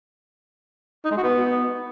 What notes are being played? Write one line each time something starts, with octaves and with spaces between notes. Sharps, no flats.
D#4
G#3
F#4
B3